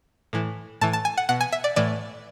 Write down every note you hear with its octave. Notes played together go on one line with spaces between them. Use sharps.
A2 E3
A2 E3 A5
A5
G#5
F#5
B2 F#5
G#5
E5
D5
A2 E3 D5